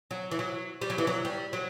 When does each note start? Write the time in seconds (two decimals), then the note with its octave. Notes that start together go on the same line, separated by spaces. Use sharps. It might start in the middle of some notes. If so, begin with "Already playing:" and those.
0.11 F#3
0.31 E3
0.39 F#3
0.81 G3
0.90 F#3
0.98 E3
1.07 F#3
1.25 G3
1.53 F#3